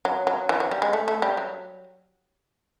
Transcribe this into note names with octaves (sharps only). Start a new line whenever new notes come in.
F#3
F#3
E3
F#3
G3
G#3
A3
A3
G3
F#3